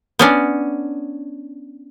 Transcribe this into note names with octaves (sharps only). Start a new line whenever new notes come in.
B3 C#4 D4